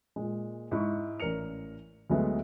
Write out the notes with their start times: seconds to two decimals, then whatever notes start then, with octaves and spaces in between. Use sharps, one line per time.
0.16 A#2 G#3
0.71 G#2 E4 E5 C#6
1.20 A1 C#4 A#4 D5 C#7 F7
2.10 D2 F#3 G#3 A3 B3